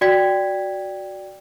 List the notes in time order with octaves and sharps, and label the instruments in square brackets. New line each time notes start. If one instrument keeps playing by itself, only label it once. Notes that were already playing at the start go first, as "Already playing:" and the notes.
[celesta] F#4 D5 G5 G#6 B6